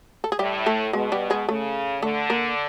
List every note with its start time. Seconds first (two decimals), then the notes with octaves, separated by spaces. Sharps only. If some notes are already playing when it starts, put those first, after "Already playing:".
0.24 A4
0.32 G#4
0.39 A2 G3 G4
0.66 A3 A4
0.93 B2 G#3 G#4
1.12 G3 G4
1.30 G#3 G#4
1.48 C#3 A3 A4
2.02 D3 A3 A4
2.30 A#3 A#4